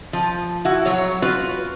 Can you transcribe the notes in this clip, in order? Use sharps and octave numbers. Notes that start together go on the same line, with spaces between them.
F3
E4 F#4
F#3 C#5
F4 F#4 B4